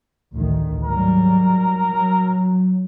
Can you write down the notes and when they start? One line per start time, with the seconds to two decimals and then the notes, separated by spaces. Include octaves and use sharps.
0.35 A1 D2 D#3
0.85 G#2 F#3 G3 A#4
1.88 F#3